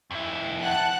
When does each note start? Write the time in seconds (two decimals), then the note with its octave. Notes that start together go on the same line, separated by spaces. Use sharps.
0.11 F2 E4
0.63 F#5 A5 F#6